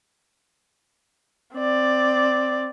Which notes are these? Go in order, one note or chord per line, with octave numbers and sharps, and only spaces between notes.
C4 D5